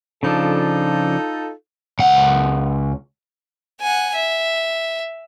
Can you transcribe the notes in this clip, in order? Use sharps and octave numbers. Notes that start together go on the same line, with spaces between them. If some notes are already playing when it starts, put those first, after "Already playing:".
C#3 F3 D4 D#4 F4 A4
C#2 F#5
F#5 G#5
E5